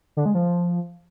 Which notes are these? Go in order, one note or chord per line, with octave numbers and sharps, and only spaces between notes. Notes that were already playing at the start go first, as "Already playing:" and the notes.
D3
G#3
F3